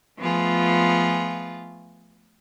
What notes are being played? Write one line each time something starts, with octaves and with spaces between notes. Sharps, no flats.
F3 A3 B3 F4 G#4